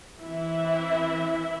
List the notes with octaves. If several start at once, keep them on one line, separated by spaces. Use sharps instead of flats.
E3 C4 E4 E5